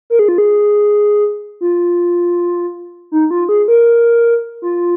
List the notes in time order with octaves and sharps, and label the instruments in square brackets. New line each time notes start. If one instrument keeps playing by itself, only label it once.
[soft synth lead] A#4
G#4
F4
G#4
F4
D#4
F4
G#4
A#4
F4